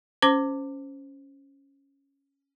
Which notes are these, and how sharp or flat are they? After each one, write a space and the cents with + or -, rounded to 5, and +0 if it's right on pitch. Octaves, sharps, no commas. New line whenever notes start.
C#4 +0 C5 -5 D6 +0